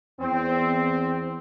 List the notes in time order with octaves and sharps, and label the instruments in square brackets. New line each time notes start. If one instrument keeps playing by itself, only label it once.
[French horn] E2 [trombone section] C4